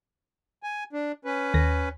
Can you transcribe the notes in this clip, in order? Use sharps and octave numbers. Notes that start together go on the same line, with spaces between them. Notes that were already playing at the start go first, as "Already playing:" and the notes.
G#5
D4
C#4 B4
D#2 A#6